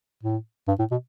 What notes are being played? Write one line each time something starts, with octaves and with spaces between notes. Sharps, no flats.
A2
G2
A2
B2